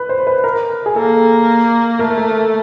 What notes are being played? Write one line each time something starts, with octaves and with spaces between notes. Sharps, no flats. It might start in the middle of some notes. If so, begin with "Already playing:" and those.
Already playing: B4
C5
B4
A#4
G#4
A#3 A4
A3 A#4
A4